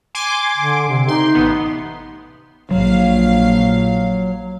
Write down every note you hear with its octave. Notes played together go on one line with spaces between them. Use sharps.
G#5 C6 D6
D3
C3
D#4 C6
A1 B3
A#1 F#3 F5